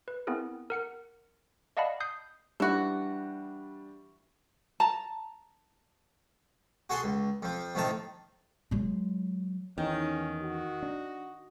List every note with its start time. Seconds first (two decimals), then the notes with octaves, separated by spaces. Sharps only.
0.08 B4
0.27 B3 C4 E4 G#4 A#4
0.70 A#4 F#5 C#7
1.77 D5 D#5 F5 F#5 A5 B5
2.00 D#6 G6 C7
2.60 E3 G3 D4 F#4
4.80 A5 A#5
6.90 F#4 G#4 A4 F#5 C6
7.04 C#2
7.43 F2 F3
7.75 F2 A2 D#3 A5 A#5
8.71 F#3 G#3
9.78 E2 D#3 C#4
10.43 F#4
10.83 D4